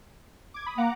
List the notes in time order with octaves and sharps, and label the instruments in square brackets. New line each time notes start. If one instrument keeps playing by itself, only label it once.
[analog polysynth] D6 G#6
B5 D#6
[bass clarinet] A#3 [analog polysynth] F#5 A#5 D6